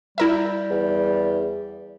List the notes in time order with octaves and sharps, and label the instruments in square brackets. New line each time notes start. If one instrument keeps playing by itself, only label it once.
[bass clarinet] G3 [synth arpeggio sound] E4 A#4 E5
[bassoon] E2